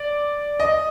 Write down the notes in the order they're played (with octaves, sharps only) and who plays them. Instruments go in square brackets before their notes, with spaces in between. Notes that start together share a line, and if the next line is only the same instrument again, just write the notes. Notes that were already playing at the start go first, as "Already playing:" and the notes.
Already playing: [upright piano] D5
D#5